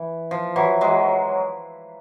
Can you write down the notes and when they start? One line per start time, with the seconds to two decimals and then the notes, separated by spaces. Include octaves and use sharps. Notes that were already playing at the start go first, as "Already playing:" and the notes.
Already playing: E3
0.31 F3
0.56 E3 F#3
0.81 F#3 G#3